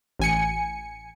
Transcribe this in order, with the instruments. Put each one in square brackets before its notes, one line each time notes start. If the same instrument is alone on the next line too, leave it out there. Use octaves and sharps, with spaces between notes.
[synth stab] A1 G#5 C#7